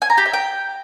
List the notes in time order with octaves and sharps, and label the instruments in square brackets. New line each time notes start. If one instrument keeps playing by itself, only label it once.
[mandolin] G#5
A#5
G4
E5
G5